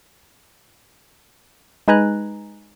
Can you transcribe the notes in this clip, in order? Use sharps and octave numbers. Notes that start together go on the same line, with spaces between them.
G#3 D#4 B4 G#5 A#5 F#6